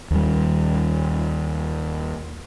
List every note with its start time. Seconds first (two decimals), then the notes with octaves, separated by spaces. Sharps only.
0.11 D#2 G3